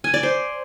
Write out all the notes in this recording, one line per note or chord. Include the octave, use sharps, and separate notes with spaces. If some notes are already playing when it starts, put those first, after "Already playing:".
G#5
D5
C5